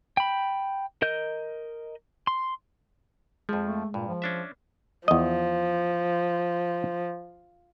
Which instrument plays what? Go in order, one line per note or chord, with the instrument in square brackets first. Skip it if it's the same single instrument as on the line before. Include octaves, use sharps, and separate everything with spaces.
[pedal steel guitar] G5 B5
A#4 D#5 G6
C6
[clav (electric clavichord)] F2 F3 [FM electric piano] G#3
[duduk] A3
[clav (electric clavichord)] G2 [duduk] A#2
[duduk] F3
[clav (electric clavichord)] C#4 D4 E5
[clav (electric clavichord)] E2 D#5 [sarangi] F3